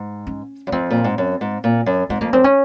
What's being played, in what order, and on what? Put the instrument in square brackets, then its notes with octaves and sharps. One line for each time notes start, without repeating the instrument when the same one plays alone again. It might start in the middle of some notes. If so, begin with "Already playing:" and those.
Already playing: [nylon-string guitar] G#2
[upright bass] C#4
[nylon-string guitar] F#2
[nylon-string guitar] F2 [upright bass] C4
[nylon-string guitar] A#2
G#2
F#2
G#2
A#2
F#2
[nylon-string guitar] G#2 [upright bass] C4
[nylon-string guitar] F2 [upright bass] A#3
[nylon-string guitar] F#2 [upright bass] C4
[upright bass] C#4